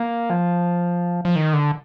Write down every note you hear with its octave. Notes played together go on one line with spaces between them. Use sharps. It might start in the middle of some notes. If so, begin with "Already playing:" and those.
Already playing: A#3
F3
F3
D#3
D3